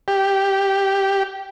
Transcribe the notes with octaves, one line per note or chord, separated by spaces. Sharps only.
G4